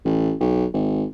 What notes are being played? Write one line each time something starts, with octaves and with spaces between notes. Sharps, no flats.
A1
B1
G#1